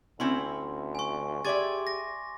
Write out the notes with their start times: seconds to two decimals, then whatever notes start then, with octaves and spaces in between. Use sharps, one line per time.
0.20 D2 C4 C#4 E4 C6
0.95 G#5 C#6
1.45 G4 G#4 D5 E5 C6 D6 A6
1.87 A#6